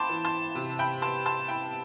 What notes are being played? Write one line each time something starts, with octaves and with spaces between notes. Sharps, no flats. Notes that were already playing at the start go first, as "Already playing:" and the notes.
Already playing: E4 G5 A5 B5 C6 D6
E3
A5 C6
C3
G5 B5
B3 A5 C6
A5 C6
E4 G5 B5